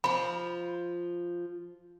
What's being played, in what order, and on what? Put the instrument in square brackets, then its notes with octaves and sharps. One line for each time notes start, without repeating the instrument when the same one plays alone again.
[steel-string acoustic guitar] F3 F4 [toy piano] B5